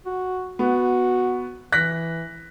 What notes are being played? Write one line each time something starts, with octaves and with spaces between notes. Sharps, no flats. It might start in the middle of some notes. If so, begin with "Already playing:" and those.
F#4
B3 F#4
E3 F#6 A#6 B6